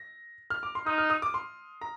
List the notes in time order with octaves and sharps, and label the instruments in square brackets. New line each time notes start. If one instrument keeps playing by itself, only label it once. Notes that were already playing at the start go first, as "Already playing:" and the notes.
Already playing: [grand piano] A#6
F6
D6
C6
[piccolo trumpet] D#4 [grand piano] D#6
[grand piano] F6
D#6
D6
C6
A#5